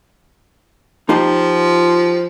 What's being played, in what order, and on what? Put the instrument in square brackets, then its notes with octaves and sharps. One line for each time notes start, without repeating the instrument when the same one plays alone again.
[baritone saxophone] F3 [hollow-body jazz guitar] D#4 F4 G4